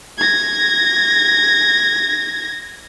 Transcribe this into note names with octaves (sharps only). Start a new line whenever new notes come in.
G#6 A#6